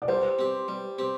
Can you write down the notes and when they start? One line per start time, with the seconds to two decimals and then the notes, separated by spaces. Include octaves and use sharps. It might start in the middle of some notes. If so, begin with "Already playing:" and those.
0.02 D5
0.08 G3 C5
0.39 C4 G4
0.68 G3
0.99 C4 G4